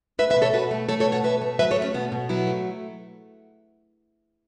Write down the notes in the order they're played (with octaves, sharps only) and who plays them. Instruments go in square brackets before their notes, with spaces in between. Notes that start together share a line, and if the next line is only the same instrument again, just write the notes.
[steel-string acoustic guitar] A3 B4 E5
B4 E5
B2
A4 C#5
B2 F#4 B4
A3
A3 A4 C#5
A4 C#5
B2
C#5 F#5
B2 B4 E5
A3
F#3 B4 E5
A4 C#5
A3
C#4
B2 B3
B2
F#3 B3 E4
A3